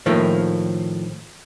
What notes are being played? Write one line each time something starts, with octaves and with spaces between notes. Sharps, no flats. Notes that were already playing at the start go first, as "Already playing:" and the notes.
A2 D#3 F3 A3 A#3